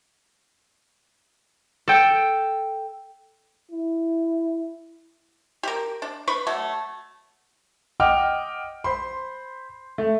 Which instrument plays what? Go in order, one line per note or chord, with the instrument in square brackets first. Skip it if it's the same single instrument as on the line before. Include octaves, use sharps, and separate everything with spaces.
[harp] A4 G5
[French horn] E4
[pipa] G4 A#4
D4
B4 B5 C#6
F#3 A3
[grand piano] D#5 F#5 G5 D6 F6
C5 B5 C6
A3